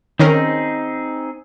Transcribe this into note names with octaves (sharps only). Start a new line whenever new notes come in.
D#3 C4 C#4 D#4 G#4 A#4